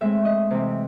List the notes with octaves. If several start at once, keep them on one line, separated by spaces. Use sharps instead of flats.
A2 G#3 C4 E5
D#5
C3 E3 C4